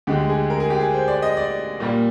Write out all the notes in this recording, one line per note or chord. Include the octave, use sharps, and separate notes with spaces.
D2 D3 G#3 G4
G#4
A#4
G#4
G4
G#4
C5
D5
D#5
D5
A#2 G3 A#3